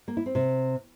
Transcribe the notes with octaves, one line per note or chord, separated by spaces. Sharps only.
A#3
E4
C4
C3